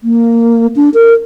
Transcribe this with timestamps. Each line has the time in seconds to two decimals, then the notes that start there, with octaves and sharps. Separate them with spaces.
0.04 A#3
0.76 D4
0.94 A#4